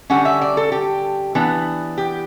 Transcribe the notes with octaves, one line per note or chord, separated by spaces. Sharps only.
D3 G3 C#4 F#5
E5
D5
A4
G4
E3 B3 D4
G4